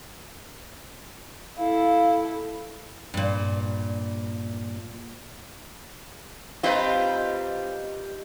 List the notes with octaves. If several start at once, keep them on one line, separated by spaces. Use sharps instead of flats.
E4 A4 F5
G2 A#2
G3 C4 D#4 F4 B4